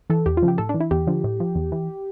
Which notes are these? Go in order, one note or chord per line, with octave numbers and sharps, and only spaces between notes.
E3 A4
E2 G4
F4
C#3 F3
G4
A2 A4
D4
E3
E4
E2 G4
D3 F3
A2
F3
E2
E3